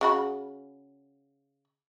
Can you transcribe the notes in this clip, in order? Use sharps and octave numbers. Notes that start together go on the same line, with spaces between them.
C#3 F#4 B5